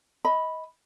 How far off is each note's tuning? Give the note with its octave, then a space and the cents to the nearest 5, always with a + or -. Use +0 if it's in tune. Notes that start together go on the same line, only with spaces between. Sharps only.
D#5 +25 B5 +0